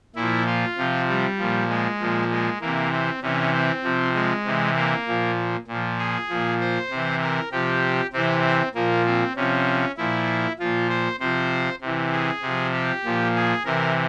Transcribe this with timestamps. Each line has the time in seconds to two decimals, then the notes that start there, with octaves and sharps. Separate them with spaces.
0.15 A#2 F3 E4
0.46 F4
0.77 C3 F3
1.08 G3
1.38 A#2 F3
1.69 G#3
2.00 A#2 F3
2.30 G#3
2.61 C3 E3 A#3
2.92 C4
3.22 C3 E3 C#4
3.53 C4
3.83 C3 F3
4.14 G#3
4.45 C3 E3
4.76 A#3
5.07 A#2 F3
5.67 A#2
5.73 F3
5.99 G#4
6.29 A#2 F3
6.60 C5
6.90 C3 E3
7.21 A#4
7.52 C3 F3 G4
8.13 C3 E3 C4
8.75 A#2 F3 A#3
9.05 C4
9.36 C3 F3 C#4
9.97 A#2 F3 E4
10.59 A#2 F3 F4
10.89 C5
11.20 C3 F3 C5
11.81 C3 E3
12.12 G#4
12.42 C3
12.47 F3
12.73 G4
13.04 A#2 F3
13.35 G#4
13.65 C3 E3 A#4